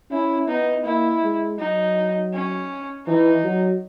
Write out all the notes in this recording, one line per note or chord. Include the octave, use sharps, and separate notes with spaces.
C#4 E4
B3 D#4
A#3 E4
G#3
F#3 D#4
C#4
E3 D#4
F#3